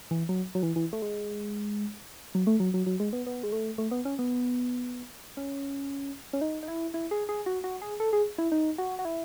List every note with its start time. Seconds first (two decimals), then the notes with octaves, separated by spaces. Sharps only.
0.11 E3
0.29 F#3
0.55 F#3
0.63 E3
0.76 E3
0.93 A3
1.02 G#3
2.35 F#3
2.47 A3
2.60 F#3
2.74 F#3
2.86 F#3
3.00 G#3
3.13 B3
3.27 B3
3.43 G#3
3.52 A3
3.78 A3
3.91 B3
4.05 C#4
4.19 B3
5.37 C#4
6.33 C#4
6.41 D#4
6.63 D#4
6.68 E4
6.94 E4
7.11 G#4
7.29 G#4
7.46 F#4
7.64 F#4
7.82 G#4
8.00 A4
8.13 G#4
8.38 E4
8.52 D#4
8.78 F#4
8.99 F#4
9.05 E4